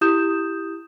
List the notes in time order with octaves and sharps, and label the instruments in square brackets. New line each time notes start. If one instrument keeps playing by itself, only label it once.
[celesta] E4 G4 D#6 G6 E7